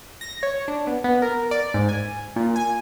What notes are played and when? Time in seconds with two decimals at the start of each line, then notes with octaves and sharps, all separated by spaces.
0.21 A#6
0.43 C#5
0.68 D4
0.87 B3
1.04 B3
1.22 A#4
1.51 D5
1.74 G#2
1.89 G#5
2.36 A#2
2.56 G#5